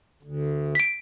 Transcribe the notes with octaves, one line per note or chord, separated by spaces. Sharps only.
D2
B6 D7